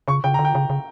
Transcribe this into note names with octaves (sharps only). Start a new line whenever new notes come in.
C#3 C#6
C#3 G5
D3 A#5
G5
C#3
C#3